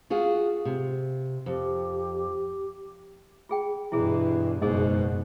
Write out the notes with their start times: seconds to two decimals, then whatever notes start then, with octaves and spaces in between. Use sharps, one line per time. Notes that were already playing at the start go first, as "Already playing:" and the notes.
0.10 F4 F#4 G#4
0.65 C3
1.46 F2 G4
3.49 F4 G#4 G5
3.92 G2 B2 E3 E4 G#4
4.62 F#1 G#2 B2 G#4 A#4 D#5